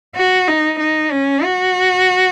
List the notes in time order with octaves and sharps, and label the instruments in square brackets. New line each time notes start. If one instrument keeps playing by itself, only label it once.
[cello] F#4
D#4
D#4
C#4
F#4